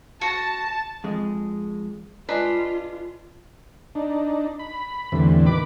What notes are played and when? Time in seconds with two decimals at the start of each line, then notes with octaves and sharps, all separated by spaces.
0.21 F#4 A5
1.04 F2 G#3
2.29 G#3 D4 F4 B4
3.95 D4 D#4
4.59 B5
5.12 E2 A2 D3 E3 G3 C4
5.46 D#3 B4 B5 D6